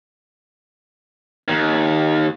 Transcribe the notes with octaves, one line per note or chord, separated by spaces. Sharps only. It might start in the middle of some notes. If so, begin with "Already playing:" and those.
D#2